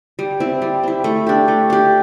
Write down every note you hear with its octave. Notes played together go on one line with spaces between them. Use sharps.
G3
C4 E4
G3
C4 E4
A3
D4 G4
A3
D4 G4